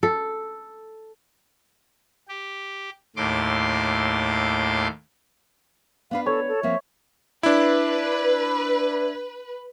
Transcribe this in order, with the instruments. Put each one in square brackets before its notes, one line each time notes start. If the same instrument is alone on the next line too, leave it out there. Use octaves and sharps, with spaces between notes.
[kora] A4
[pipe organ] G4
D#2 A2 C6 D6
[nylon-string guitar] B3 D4 B4 [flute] F5
[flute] A4 [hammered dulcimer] C#5
[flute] A4
[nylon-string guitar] F3 A#3 C4 [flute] E5
[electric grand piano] D4 E4 [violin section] B4